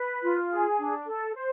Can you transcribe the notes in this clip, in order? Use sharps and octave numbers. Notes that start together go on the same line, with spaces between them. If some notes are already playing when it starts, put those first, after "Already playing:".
Already playing: B4
F4
G#4
D4
A4
C5